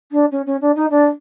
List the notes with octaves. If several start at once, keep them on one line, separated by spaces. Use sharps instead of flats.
D4
C#4
C#4
D4
D#4
D4